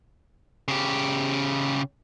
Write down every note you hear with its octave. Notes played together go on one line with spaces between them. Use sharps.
C#3 G4